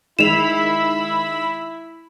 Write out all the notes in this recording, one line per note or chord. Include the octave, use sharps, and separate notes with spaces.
D#3 G#3 E4 B5 E6 B6 E7 F7